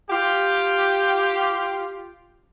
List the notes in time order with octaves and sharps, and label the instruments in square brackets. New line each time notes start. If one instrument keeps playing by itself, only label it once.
[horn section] F4 G4